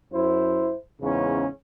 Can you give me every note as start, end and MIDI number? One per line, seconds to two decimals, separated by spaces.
0.13 0.74 42
0.13 0.74 64
0.13 0.74 72
1.01 1.45 40
1.01 1.45 44
1.01 1.45 49
1.01 1.45 61